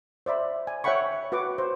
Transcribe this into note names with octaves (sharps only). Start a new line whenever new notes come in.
C5 D5 E5 B5
G#5
C#5 E5 F#5 G5 B5 C#6
F#4 B4 F#5 D6
C5